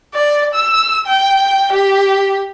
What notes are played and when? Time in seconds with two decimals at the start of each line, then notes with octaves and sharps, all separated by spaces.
0.14 D5
0.54 E6
1.06 G5
1.72 G4